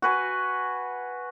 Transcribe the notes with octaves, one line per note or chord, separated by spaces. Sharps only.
F#4 B4 G#5